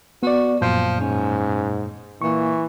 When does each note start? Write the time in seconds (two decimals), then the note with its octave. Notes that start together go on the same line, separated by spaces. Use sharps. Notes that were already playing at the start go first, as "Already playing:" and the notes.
0.23 B3 F#4 D5
0.62 F#2 A#2 F3 G6
1.00 G#2 C#4
2.22 A#2 E3 C#6